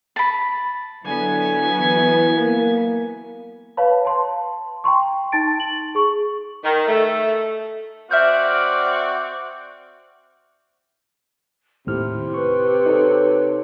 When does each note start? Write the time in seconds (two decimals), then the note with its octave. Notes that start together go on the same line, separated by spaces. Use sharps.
0.16 A5 B5
1.06 D3 F#3 B3 E4 G#5
1.81 E3
2.36 A#3
3.77 B4 C#5 F5 A5 B5
4.05 A5 C6
4.84 G5 A#5 C6 C#6
5.32 D#4 A5 A6 D7
5.60 F#7
5.95 G#4 C#6
6.64 D#3
6.87 A3
8.11 C4 F#4 D5 E5 F6 G6
11.87 D#2 A2 C3 E4 F6
12.34 B4 C#6
12.86 D#4 A4 C#5